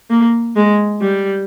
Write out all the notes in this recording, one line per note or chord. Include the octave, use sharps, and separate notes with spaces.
A#3
G#3
G3